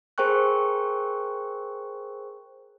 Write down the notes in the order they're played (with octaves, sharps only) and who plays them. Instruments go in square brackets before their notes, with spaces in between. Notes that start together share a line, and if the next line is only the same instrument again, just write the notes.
[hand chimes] G#4 A#4 C5 G5 C#6 F#6